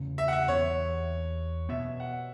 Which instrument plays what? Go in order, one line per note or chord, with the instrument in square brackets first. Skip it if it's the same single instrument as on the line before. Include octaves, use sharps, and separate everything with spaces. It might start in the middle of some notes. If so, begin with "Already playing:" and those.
Already playing: [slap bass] E2 C#3 A3 C#4
[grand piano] E5
F#5
E5
[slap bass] E2 E3 B3 [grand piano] C#5
[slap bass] B2 B3 [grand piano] E5
[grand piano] F#5